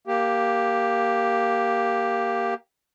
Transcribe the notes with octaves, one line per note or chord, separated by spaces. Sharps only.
A#3 G4